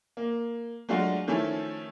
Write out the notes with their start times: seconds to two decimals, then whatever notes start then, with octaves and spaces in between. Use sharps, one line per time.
0.17 A#3
0.89 F#3 G#3 A3 D4 F4 F#4
1.27 D#3 F3 A3 C#4 E4